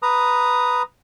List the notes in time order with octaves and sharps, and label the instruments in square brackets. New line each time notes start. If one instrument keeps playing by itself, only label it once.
[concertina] B4 A#5 D#6